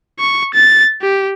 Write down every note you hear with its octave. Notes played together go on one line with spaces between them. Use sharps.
C#6
A6
G4